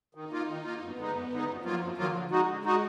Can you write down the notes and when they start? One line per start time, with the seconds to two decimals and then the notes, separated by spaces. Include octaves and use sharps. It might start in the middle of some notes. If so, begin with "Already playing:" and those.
0.15 D#3 D#4
0.31 A#3 F4
0.48 D#3
0.64 A#3 F4
0.81 F#2 B3
0.97 D3 G#3 D#4
1.14 F#2
1.31 D3 G#3 D#4
1.47 F#2 F3
1.64 D#3 F#3 A#3 F4
1.80 F#2
1.98 D#3 F#3 A#3 F4
2.14 D3
2.31 G#3 D#4 F#4
2.47 D3 G#3
2.63 G#3 D#4 F#4